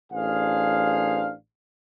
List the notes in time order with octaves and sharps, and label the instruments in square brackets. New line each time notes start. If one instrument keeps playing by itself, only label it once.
[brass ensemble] A1 D4 G#4 C5 F5